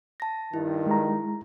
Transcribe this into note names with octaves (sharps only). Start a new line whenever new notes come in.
A5 A#6
G2 D#3 E4
G#3 A#5